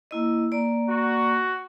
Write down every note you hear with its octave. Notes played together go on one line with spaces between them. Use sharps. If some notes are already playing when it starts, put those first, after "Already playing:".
A#3 E4 D#5
A#3 D5 A#5
F#4